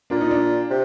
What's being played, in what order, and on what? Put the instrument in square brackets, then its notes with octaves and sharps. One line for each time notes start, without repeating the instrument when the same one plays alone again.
[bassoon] A#2 [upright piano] D4
[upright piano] D#4
D4
[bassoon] C3